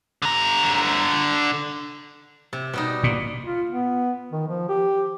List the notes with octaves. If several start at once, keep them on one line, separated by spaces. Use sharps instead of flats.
D3 A#5
C3
B2 G3 D#4
A#2
F4
B3
D#3
F3
G4